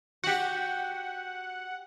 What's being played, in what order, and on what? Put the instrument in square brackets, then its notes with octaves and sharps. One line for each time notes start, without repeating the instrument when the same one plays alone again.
[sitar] F#4 G4 [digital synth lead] F#5